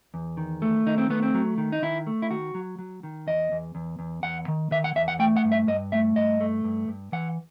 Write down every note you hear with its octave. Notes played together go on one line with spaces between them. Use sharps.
E2
D#3
A3
D#3 D#4
C4
A3 B3
C4
F#3
D#3
D#4
D#3 E4
A3
E4
D#3 F#4
F#3
F#3
D#3
E2 D#5
E2
E2
E2
E2 F#5
D#3
D#3 E5
F#5
E2 E5
F#5
A3 G5
F#5
G2
E5
G2 D#5
A3 E5
G2 D#5
A3
G2
G2
E3 F#5